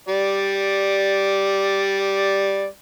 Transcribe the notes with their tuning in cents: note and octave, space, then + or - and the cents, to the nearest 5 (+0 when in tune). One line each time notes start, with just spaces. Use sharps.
G3 +0 D5 +0